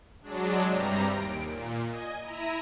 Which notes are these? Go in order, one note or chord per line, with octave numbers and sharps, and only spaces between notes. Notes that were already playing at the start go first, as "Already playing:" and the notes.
F#3 G#3 D4
G2 C3 G3 A#5
D#2 D7
A#2
D#5 G#5
E4 A#5 D#7